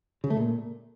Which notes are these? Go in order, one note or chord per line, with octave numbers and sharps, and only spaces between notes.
C#3
A3
A#2